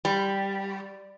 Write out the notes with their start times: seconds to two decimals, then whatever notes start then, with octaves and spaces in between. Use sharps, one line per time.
0.05 G3